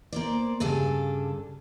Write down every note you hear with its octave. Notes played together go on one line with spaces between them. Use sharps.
A#3 C5 D5
G2 C#3 D4 A4 G#5